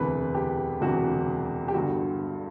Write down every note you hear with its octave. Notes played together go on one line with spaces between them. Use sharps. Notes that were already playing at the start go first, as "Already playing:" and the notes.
Already playing: E1 D2 C3 E3 B4
G4
E1 D2 C3 E3 F#4
G4
G1 G2 D3 F#4